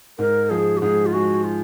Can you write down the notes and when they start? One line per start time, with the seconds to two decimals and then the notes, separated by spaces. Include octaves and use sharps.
0.19 G#2 A#4
0.50 F3 G#4
0.77 F#4
0.81 G#2 G#4
1.06 F4
1.13 G#3 F#4
1.44 F4